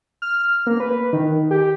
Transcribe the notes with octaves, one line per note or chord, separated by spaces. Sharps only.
F6
A#3
B4
D#3
G4